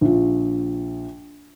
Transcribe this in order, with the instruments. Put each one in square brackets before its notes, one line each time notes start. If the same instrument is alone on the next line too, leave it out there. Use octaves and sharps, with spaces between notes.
[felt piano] A#1 F4